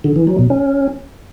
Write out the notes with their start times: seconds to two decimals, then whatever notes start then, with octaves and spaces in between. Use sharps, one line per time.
0.04 D3
0.16 E3
0.27 F#3
0.39 B2
0.50 C#4